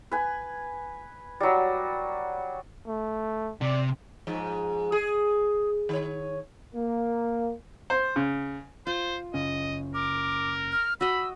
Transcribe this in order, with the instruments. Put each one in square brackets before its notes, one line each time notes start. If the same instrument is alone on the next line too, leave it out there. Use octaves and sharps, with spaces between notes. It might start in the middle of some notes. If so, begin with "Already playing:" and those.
[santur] B4 G#5
F#3 G3
[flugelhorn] A3
[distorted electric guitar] C3 [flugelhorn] D5
[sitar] G#2 F3
G#4
D#3 C#5
[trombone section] A#3
[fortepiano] C5
C#3
[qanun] F4 [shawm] C5
[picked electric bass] F#1 C#3 C#4 [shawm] D#5
[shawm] A#4 [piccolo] D6
[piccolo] F6
[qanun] F#4 D#5 [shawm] B5 [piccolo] E6